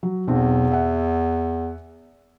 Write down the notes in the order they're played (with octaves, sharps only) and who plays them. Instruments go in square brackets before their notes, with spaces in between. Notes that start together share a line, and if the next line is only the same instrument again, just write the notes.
[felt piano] F#3
[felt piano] B1 C4 [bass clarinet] E2
[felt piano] E5 F#5